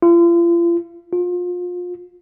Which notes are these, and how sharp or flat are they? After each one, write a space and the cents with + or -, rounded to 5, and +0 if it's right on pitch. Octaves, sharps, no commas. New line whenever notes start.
F4 -40
F4 +30